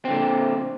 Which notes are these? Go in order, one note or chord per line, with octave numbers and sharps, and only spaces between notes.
A#2 D3 C4